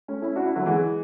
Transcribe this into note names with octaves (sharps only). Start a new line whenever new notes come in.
A3 C#4
C#4 E4
D4 F#4
C#4 E4
D3 F#3
E3 G#3